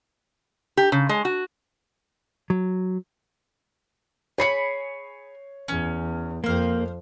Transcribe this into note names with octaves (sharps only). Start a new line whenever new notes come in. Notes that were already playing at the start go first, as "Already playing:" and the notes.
G4
C#3
G#3
F#4
F#3
G#4 C#5 B5 C7 C#7
E2 C#4
F2 A#3 C5 F5